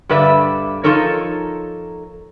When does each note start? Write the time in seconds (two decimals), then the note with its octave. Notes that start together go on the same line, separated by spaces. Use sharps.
0.09 G2 D3 B4 D5 E5
0.84 F3 G3 D#4 A4 A#4 C#5